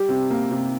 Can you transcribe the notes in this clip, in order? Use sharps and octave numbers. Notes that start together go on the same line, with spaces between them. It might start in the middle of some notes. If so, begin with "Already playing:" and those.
Already playing: G3 G4
C3
A#3
C3